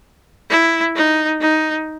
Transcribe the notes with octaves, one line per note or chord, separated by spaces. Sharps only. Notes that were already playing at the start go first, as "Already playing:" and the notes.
E4
D#4
D#4